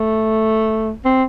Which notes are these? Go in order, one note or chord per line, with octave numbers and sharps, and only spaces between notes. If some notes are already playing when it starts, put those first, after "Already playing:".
Already playing: A3
C4